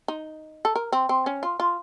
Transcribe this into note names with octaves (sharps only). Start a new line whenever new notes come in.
D#4
A4
A#4
C4
C4
C#4
F4
F4